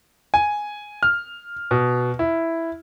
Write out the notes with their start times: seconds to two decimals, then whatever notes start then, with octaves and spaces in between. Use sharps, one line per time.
0.34 G#5
1.03 F6
1.71 B2
2.19 E4